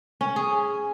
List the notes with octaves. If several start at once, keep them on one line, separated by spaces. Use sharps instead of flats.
C#4
G#4